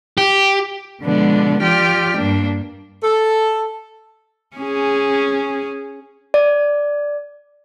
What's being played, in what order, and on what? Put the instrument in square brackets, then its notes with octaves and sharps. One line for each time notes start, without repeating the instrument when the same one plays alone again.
[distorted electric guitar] G4
[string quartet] B2 D3 F3 G#3 B3 D4
F3 F4 G4 D5 G5 F6
G2 A#3 D4
[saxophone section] A4
[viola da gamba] C#4 G#4
[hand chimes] D5